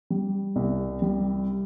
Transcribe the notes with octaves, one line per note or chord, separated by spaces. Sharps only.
G3
C2
G3